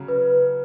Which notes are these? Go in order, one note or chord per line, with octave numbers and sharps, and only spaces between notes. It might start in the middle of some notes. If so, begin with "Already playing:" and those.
Already playing: C#3 F#3
B4